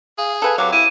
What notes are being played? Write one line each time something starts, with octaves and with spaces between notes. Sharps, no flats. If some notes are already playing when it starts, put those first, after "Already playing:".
G#4 F5
A4 B4 F5 G#5
C3 E3 F#3 F5 D6
E4 D#7